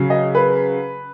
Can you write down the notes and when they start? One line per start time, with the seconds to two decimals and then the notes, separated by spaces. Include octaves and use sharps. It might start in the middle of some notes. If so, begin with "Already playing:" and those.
Already playing: C#3 F#3
0.10 D#5
0.35 B4